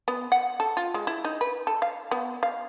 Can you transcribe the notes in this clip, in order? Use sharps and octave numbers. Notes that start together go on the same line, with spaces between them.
B3
F#5
A4
F4
G#3
E4
D#4
B4
A4
F5
B3
F5